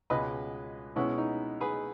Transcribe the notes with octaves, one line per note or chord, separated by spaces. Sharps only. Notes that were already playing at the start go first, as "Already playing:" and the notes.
C#2 B2 G#3 B4 D#5
B2 G#3 B3 C#4 E4
D#4
G#4 B4